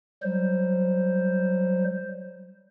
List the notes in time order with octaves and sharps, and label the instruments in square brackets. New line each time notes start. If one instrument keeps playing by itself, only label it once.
[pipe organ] F#3 G3 C5